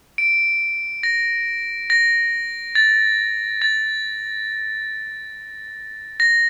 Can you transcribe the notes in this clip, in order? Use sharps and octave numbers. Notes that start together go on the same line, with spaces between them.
D7
A#6
A#6
A6
A6
A#6